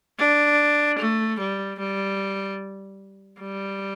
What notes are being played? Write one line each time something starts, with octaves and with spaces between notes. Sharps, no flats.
D4
A3
G3
G3
G3